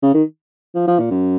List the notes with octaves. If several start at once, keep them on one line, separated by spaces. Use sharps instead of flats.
C#3
D#3
F3
F3
A#2
F#2